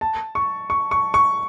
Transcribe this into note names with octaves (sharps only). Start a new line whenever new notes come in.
A5
C#6
C#6
C#6
C#6